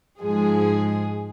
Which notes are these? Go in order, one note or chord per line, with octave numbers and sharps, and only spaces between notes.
G#2 F3 G#3 G#4